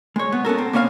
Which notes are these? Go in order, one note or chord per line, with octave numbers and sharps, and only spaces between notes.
G#3 C#5
B3
B3 C#4 A4 A#4
C4
A#3 B3 C#5 D#5 F5 G#5